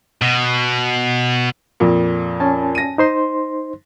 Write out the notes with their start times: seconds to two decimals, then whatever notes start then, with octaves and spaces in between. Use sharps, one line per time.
0.22 B2
1.80 F2 A#2
2.40 C#4 G#5 A5
2.75 A#6 D#7
2.98 D#4 C5 C6